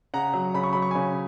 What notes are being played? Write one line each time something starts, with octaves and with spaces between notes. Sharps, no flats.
C#3 F#5 A#5
F#3
C#3 B5
C#6
F#3 B5
C#6
C#3 G#5 B5